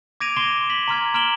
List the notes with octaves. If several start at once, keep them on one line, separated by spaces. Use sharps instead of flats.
D6 G#6 A#6 D7 D#7 F7
C6 D6 C7 D7 E7 G7
B6 F#7
A#5 C6 F6 G#6
A#5 F6 D7 E7 F#7 G7